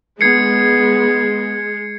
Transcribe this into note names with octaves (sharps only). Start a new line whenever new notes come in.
G#3 B3 G#6 C7 C#7